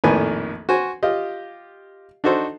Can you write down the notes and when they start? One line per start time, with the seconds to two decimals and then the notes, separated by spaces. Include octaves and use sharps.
0.04 A#1 F2 A2 D#3 B4 G#5
0.69 F#4 C5 G#5
1.03 F4 G4 D#5
2.24 D4 D#4 F#4 A4 C5